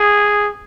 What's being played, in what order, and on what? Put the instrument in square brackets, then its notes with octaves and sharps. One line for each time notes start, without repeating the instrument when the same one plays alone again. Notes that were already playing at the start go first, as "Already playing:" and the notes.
Already playing: [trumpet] G#4